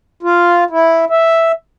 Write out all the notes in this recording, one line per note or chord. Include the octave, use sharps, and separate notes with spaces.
F4
E4
E5